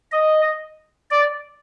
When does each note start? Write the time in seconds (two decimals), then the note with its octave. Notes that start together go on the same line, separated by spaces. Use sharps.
0.12 D#5
1.11 D5